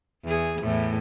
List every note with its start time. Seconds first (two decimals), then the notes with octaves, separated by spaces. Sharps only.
0.24 E2 G#4
0.62 E2 A2